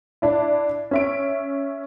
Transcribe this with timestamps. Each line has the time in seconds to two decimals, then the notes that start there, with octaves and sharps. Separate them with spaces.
0.22 D4 E4
0.91 C#4 E5 D7